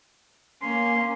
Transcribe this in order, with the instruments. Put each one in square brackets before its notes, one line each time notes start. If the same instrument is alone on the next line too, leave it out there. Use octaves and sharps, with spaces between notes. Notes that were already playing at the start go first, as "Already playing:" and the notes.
[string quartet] A#3 C#4 [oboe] C6